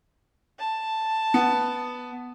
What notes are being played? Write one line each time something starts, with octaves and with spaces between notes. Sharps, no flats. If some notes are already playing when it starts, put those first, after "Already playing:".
A5
B3